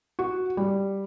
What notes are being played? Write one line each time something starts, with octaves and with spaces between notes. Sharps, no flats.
F#4
G3